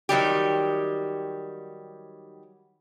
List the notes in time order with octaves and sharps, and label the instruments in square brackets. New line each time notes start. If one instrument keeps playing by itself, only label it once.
[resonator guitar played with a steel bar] D#3 F#3 G3 G4